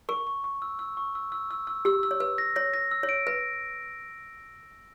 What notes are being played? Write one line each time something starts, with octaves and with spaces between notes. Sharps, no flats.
A#4 C#6
C#6
C#6
E6
E6
C#6
E6
E6
E6
E6
G4 E6
E6
C#5
B4 E6
A#6
C#5 A#6
A#6
E6
C#5
D7
B4 A#6